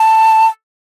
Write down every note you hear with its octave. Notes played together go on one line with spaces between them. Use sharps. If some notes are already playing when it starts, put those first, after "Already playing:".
Already playing: A5